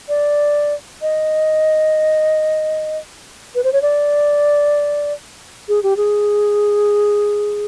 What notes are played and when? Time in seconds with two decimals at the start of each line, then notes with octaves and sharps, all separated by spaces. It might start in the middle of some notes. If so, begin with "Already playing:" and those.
0.09 D5
1.02 D#5
3.55 B4
3.64 C5
3.73 C#5
3.82 D5
5.68 G#4
5.83 G4
5.97 G#4